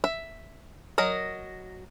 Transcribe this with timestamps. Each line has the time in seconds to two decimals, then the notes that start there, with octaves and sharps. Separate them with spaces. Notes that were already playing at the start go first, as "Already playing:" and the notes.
0.04 E5
0.98 F#3 A#4 D#5